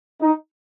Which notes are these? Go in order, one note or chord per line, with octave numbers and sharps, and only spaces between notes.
D#4